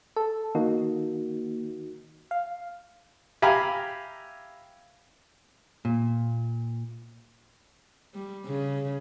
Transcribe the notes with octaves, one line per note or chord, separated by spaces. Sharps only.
A4
D#3 A#3 D#4 F#4
F5
G4 E5 F5 G#5 A#5 B5
A#2
G3
C#3